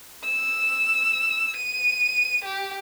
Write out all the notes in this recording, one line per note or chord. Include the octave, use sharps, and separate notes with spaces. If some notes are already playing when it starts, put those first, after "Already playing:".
E6
D#7
G4